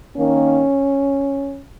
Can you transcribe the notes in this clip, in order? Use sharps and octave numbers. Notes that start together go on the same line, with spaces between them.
D#3 A#3 C#4